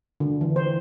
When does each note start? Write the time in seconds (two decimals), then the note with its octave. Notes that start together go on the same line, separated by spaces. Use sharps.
0.20 D3
0.41 E3
0.56 C5